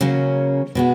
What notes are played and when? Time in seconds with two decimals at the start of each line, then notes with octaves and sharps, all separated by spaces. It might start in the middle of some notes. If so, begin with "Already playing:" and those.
0.01 C#3 F#3 A#3 C#4
0.75 B2 G#3 B3 F#4